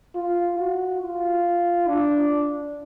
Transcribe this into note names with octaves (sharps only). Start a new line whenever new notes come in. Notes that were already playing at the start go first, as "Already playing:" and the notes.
F4
F#4
F4
D4